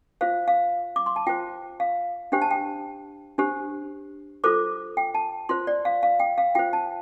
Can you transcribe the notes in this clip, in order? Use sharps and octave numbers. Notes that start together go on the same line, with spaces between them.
F4 C5 F5
F5
D6
C6
A5
F4 C5 G5
F5
D4 G4 C5 G5
A5
G5
D4 G4 C5
F4 A4 C5 D6
G5
A5
F4 C5 C6
D5
F5
F5
G5
F5
F4 C5 G5
A5